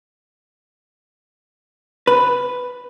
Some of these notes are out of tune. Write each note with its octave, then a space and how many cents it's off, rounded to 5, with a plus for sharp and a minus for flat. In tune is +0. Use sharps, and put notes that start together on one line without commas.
B4 +5